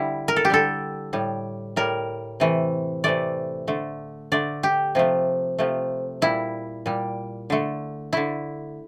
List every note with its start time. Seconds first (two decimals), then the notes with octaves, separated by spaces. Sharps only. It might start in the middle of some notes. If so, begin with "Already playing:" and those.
Already playing: D3 G3 E4
0.28 A#4
0.36 A4
0.45 G4
0.50 D3 G3 A4
1.13 A2 G3
1.76 A2 G3 A#4
2.40 C3 E3 A3
3.04 C3 E3 A3 D5
3.67 D3 A3
4.32 D3 A3 D5
4.63 G4
4.95 C3 F3 A3
5.59 C3 F3 A3
6.22 A#2 G3 E4
6.86 A#2 G3
7.50 D3 A3
8.13 D3 A3 E4